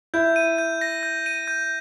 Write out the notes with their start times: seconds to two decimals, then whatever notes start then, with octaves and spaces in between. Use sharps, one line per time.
0.14 E4 G6
0.36 D#7
0.58 G6
0.81 A#6
1.03 G6
1.26 D#7
1.48 G6